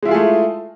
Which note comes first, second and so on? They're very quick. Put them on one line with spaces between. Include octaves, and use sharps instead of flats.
G#3 E4 F4 G#4 A3